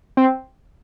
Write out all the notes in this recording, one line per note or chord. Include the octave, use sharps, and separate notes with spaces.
C4